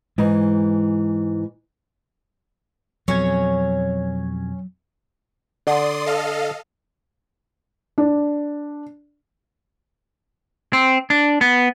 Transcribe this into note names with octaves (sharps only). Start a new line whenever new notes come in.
G#2 E3 G#3
F2 B2 F#3 C#4 C#5 G#6
D3 D5 C6 D#6
A4 D#5 F5
D4
C4
D4
B3